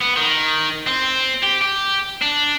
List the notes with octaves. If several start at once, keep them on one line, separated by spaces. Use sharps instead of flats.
B3
D#3
C4
G4
G4
D4